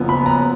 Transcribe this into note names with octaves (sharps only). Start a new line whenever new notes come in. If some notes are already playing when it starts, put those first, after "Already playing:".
Already playing: F#1 F#2 F3 B3
B5
A#5